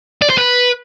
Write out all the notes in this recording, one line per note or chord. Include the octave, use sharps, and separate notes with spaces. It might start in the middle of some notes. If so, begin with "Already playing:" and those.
D5
C5
B4